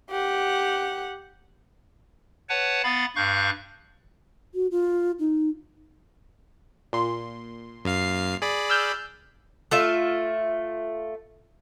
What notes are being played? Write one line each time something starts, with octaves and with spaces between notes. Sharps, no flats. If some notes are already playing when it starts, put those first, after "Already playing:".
G4 F#5
B4 C#5 F#5 A5
B3 F5 B5 A6
G2 F5 C#6 F#6 G6
F#4
F4
D#4
A#2 C6
F#2 F5 C7
G#4 D5 B5
E6 F6 G6
A3 F4 E5